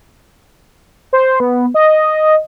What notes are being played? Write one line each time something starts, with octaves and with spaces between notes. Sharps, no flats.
C5
B3
D#5